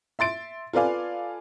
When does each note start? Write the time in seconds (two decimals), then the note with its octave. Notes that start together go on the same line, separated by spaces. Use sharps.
0.19 E5 C6 A6 D7
0.73 F4 A4 B4 D5 F5 G#5